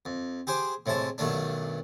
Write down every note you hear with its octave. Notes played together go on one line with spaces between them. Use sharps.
F2
G4 G#4 C5 D6
A2 C3 G#3 A5
B1 G2 D#3 A3 D4